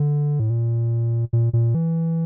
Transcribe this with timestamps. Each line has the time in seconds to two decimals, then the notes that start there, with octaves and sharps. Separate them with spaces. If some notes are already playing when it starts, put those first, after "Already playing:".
Already playing: D3
0.40 A2
0.50 A#2
1.33 A#2
1.53 A#2
1.75 E3